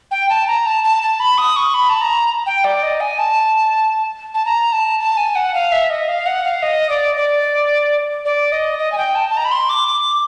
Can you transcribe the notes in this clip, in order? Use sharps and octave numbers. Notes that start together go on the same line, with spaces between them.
G5
A5
A#5
A5
A5
A5
B5
D#6
C#6
B5
A5
A#5
G5
D5
D#5
G#5
A5
A5
A#5
A5
A5
G#5
F#5
F5
E5
D#5
F5
F#5
F5
D#5
D5
D5
D5
D#5
D#5
G#5
G5
A5
A5
A#5
B5
C6
D6
D6